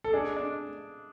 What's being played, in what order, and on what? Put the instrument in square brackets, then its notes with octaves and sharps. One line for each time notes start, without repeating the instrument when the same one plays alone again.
[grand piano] A4
[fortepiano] D4 [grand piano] G#4
[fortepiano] D4